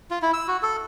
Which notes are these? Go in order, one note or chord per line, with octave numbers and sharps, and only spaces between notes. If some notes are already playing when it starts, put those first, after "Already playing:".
F4
E4
E6
F#4
A4